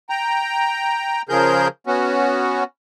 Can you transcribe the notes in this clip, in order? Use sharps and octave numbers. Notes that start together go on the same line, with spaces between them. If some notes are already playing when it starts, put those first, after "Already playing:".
G5 A#5
C#3 F3 G#4 A#4 G6
B3 C#4 F#4